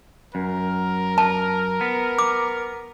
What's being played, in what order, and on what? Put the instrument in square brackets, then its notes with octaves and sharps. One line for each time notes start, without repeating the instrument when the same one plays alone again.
[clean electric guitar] F#2 [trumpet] A#4
[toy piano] A5
[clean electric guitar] B3
[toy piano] D6